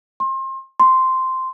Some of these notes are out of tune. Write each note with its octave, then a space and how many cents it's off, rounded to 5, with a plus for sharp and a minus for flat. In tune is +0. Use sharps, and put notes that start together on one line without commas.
C6 +30
C6 -5